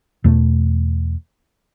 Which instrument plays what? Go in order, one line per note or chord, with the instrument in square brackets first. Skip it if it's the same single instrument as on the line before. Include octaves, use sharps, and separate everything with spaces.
[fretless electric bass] E2 B2 A3